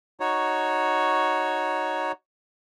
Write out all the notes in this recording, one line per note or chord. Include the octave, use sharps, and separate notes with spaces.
D#4 F#4 C#5